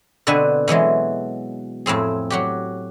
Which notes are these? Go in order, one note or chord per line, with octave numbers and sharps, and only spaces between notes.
B2 D3 C4 B4 G#5
B2 E3 F#3 G#3
F2 A2 C4 G#4
F#3 F#4 G4